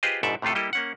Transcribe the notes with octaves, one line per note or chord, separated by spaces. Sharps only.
F4 G4 G#4 B4 C5 D#5
G1 G#2 B2 A4 D5 E5
A2 C3 A3 F4 A4
G3 A#3 E4 G4 A4 D#5
A#3 C#4 F#5